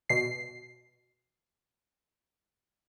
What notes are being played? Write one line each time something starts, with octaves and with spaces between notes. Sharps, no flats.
B2 C7